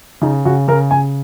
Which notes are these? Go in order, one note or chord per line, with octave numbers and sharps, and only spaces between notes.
C#3 D#4
C#3 F#4
C#3 A#4
C#3 G#5